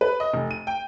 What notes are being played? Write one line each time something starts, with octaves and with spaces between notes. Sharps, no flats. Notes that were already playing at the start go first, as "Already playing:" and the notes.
B4
D#5
F1
D#7
G5